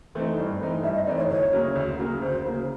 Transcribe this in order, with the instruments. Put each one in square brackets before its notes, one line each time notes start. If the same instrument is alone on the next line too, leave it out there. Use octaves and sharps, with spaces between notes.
[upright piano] E3 A3 C4 D#4
G2
E3 A3 C4 D#4
[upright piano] G2 [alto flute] E5
[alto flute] D#5
[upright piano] E3 A3 C4 D#4 [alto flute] D5
[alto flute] C#5
[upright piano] D2 [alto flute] C#5
[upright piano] C#3 F#3 A#3
D2
C#3 F#3 A#3
[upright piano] D2 [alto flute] C5
[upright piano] C#3 F#3 A#3